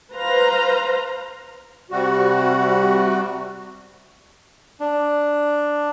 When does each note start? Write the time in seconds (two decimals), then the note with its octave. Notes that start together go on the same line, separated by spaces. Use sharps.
0.12 B4 C5 F5 A#5
1.91 C3 G3 F#4
4.80 D4